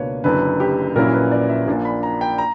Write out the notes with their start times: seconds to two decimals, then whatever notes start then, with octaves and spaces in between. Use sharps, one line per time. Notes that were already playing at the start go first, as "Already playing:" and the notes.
Already playing: C#2 B2 A#3 D4 B4 C#5
0.24 F#1 F#2 D3 B4
0.60 G4
0.95 A#1 A#2 F#3 C#4 E4 A#4
1.14 B4
1.31 D5
1.49 E5
1.68 A#1 A#2 A#3 D4
1.85 B5
2.03 A#5
2.21 G5
2.38 A#5